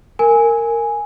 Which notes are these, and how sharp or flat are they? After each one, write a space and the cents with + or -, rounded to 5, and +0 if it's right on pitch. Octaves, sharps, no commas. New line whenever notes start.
A#4 -15 G#5 +0